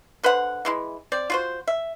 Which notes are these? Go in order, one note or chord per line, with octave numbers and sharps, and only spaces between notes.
D3 B4 C5 F#5
E3 G#3 E4
C4 D5
F4 F#4 C5
E5